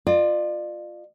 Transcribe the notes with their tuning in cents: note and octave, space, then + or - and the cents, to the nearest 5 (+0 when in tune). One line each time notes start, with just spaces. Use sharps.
F4 +0 D5 +40